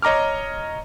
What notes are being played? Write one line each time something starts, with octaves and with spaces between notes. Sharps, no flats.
C#5 D#5 A#5 D6 F6